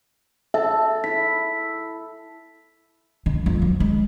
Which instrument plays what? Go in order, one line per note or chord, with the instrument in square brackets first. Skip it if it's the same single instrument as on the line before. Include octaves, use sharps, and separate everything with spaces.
[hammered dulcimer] A4 [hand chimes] E5
[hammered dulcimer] E4 [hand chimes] B6
[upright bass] D3
F2
F#3
G#3